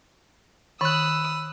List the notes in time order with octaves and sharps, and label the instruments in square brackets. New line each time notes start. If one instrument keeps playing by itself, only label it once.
[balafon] D#3 [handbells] B5 F#6 [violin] D#6 E6